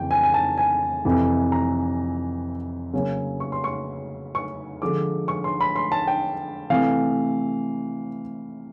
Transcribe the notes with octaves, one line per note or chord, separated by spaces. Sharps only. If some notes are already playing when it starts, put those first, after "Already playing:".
Already playing: F2 C#3 E3 G5
G#5
G#5
A5
G#5
F2 C3 E3
A#5
C#3 F#3 A#3 C#4
C#6
C6
C#6
C#6
D3 F3 G#3 D6
C#6
C6
B5
C6
A5
G5
C3 E3 A3 F5